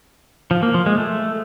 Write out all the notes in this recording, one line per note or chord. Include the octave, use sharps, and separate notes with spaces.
F3
A#3
F3
G#3
A3